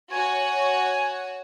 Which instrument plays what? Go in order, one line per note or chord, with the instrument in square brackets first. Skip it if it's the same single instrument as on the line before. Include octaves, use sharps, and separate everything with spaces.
[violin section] F#4 C#5 [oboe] G#5